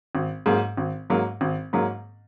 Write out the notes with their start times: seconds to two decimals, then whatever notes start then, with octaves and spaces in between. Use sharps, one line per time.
0.15 G#1
0.46 G#2 F#3 A#3
0.77 G#1
1.10 G#2 F#3 A#3
1.41 G#1
1.73 G#2 F#3 A#3